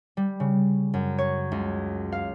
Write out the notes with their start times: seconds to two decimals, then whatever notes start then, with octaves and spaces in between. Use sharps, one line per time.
0.17 G3
0.40 C#3
0.94 F#2
1.18 C#5
1.52 C#2
2.12 F5